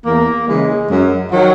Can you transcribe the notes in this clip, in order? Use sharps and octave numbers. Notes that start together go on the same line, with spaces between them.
E2 A#3
C#3 E3 G#3
F#2
D#3 F#3